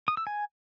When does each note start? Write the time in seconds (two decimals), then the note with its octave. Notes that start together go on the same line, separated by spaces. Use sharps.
0.08 D#6
0.17 E6
0.27 G#5